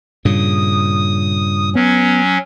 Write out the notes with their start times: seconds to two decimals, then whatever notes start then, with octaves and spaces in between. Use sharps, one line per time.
0.25 G2 A#2 C#3 D#6
1.75 F#3 B3 C#4